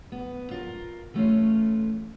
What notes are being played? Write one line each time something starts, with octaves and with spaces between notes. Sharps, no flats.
B3
F4 A#4
E3 A3 C#4 F4